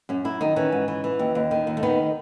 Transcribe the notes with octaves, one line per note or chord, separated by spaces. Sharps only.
F#2 C#4
F#2 E4
D#3 D#4
E3 C#4
G#2
E3
E3
D#2
D#2
D#3
D#2
A3
D#3 B3